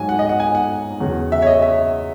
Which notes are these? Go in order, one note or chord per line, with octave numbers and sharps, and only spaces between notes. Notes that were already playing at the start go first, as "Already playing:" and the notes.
Already playing: G#2 F#3 G#5
F#5
D#5
F#5
G#5
F#5
E2 C#3 F#3
E5
C#5
D#5
E5